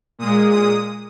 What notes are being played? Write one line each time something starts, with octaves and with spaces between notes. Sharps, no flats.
A#2 G#3 D#6
D#6